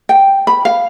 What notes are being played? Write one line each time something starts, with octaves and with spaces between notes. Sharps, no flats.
G5
B5
F5